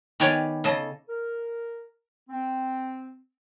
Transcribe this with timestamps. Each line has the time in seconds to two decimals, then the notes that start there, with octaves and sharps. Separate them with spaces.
0.20 D#3 B3 G4 C#5 D5 G#5
0.64 C#3 A4 D#5
1.09 A#4
2.30 C4